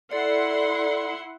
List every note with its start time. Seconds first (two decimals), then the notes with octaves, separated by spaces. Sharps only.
0.11 E4 A4 D5 F#5 C6